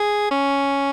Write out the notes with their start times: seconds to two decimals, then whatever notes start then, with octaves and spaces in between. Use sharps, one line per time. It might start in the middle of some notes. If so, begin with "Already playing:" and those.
Already playing: G#4
0.31 C#4